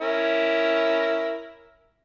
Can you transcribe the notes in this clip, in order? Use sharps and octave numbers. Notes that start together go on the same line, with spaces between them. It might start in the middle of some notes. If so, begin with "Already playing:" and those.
C#4 E4 A#4